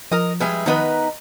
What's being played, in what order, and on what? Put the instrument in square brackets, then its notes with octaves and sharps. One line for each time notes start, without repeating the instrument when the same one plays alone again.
[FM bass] F3 [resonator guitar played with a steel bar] A#4 D#5
[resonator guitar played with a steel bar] G3 G#3 [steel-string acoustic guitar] B4 E5 G#5
[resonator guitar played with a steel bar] D#3 B3 B4 [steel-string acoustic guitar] D#4 A#5